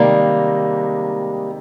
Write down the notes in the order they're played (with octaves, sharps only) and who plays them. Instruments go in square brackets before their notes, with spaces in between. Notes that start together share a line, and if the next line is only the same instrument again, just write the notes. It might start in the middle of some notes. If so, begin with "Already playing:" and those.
Already playing: [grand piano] C3 D#3 G#3 D#4 [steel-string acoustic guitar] G3 A#3